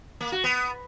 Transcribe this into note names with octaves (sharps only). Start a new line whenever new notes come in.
A#3
F#4
B3